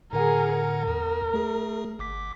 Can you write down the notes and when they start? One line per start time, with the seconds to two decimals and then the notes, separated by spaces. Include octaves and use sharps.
0.13 A2 D3 G#4 A#4 F#5
0.54 A#4
0.88 E2
1.34 A3 G#4
1.99 G1 D6 B6